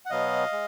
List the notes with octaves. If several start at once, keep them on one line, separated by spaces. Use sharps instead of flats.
F#5
B2 F#3 B3 D#5 F5
G#3